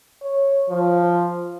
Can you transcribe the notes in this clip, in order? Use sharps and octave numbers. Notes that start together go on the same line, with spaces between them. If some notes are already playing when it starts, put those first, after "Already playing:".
C#5
F3